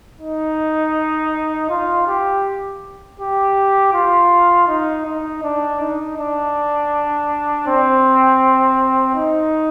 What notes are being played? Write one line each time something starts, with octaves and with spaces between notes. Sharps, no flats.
D#4
F4
G4
G4
F4
D#4
D#4
D4
D#4
D4
C4
D#4